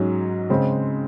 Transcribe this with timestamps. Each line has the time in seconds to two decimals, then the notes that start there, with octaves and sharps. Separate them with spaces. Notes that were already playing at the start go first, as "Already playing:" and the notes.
Already playing: G#2 F#3 C#4
0.50 C#3 G#3 C4